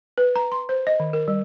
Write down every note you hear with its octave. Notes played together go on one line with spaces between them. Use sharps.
B4
A#5
C6
C5
D#5
D#3
A#4
G3